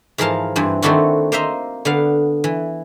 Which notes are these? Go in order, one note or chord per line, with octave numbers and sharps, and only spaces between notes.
G#2 E3 F3 A#4 F5 A5
G2 E3 C4
D#3 A3 C4 D4 E4 F#4
A#3 C5 D#5 E5 A#5
D3 B3 F5
E3